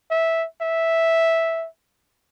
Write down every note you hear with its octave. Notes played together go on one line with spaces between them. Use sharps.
E5
E5